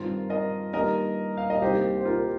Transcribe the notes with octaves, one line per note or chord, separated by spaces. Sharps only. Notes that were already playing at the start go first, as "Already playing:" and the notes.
Already playing: G2 D#3 C4 F4 A#4
A#4 D#5
G2 D#3 G3 A#3 A#4 D#5
F5
D#5
C2 C3 D#3 A#3 G4 C5
C5
F4 A#4